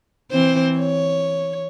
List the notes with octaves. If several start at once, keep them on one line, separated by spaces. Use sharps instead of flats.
E3 C4 C5
C#5